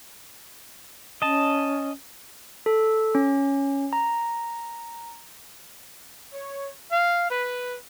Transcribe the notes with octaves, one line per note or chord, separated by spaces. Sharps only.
C#4 D#5 A5
A4
C#4
A#5
C#5
F5
B4